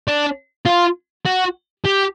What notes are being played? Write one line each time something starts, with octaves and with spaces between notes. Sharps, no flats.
D4
F4
F#4
G4